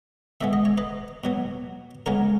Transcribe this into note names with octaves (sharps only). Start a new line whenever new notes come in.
B2 G#3 B3 E5
D#5
C#5
B4 D#5
B2 F#3 B3
C#3 G#3 B3 A#4 C#5